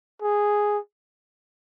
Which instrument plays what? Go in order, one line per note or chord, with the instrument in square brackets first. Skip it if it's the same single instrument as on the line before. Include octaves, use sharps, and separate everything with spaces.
[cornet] G#4